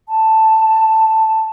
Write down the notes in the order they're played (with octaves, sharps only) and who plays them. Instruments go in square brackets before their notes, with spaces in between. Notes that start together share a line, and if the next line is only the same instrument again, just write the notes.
[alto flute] A5